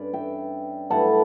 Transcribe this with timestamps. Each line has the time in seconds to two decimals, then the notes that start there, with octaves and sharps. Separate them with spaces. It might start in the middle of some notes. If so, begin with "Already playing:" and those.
Already playing: G2 C#4 B4 D5
0.13 E5 G5
0.90 G2 F#3 A3 E4 F#5 A5